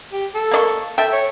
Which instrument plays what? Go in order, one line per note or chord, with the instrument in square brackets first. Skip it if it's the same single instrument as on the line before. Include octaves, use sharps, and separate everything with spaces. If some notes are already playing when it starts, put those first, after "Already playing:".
[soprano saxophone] G4
A4
[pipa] A#3 D5 C#6
[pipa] A4 G5 [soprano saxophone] E5
[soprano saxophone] C#5